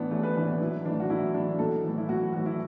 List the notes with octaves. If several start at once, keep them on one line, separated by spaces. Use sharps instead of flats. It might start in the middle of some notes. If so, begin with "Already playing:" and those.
Already playing: A2 E3 B3 D4
A1 A3
B4
A2 E3 D4
B3
B1 E4
A2 E3 D4
F#4
B1 E4
A2 E3 D4
B1 A4
A2 E3
E4
B1 F#4
A2 E3 F#4
E4